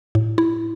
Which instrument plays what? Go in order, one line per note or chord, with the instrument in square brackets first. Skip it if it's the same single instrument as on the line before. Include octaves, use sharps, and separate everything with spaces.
[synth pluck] A2
E4